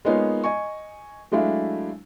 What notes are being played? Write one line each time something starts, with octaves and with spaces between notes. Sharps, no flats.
G#3 A#3 B3 D#4 F4 C#5
D#5 G#5 C#6
F#3 G#3 A3 D4 E4 F5